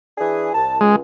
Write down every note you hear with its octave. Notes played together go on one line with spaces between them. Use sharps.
E3 D4 G#4
C2 A5
C#2 G#3